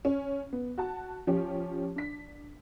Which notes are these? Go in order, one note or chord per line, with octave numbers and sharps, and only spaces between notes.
C#4
B3
F#4 A5
F3 C#4 G4
D4 B6